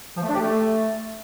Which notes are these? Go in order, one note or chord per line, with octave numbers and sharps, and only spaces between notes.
F3
A3
D4
G4
A3